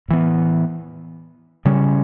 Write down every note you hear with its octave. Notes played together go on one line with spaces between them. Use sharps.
A2 E3 B3
C#3 G3 C#4